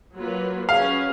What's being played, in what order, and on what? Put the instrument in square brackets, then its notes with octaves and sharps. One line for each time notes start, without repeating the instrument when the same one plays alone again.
[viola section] F#3 A#3 F4 B4
[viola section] F#3 C#4 G#4 B4 [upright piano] F5